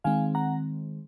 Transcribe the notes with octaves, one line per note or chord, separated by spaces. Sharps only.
D#3 G#3 C4 F5 G#5
F#5 A#5